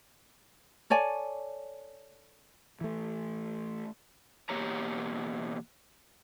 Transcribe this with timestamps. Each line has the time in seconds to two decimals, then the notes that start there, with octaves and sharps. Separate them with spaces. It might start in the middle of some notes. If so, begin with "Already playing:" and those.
0.90 A4 C#5 D5 G#5
2.81 E3 A3
4.49 E2 B2 A#3 G4 C#5 A#5